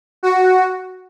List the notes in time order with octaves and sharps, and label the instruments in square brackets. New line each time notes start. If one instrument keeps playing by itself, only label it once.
[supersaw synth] F#4